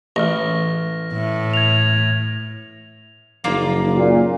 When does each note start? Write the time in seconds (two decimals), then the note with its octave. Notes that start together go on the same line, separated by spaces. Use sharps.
0.16 A1 F6 A#6
1.13 A2
1.54 G#6 F7
3.44 F#1 F3 A#3 D#4 F4 D5
3.96 A#2 F#4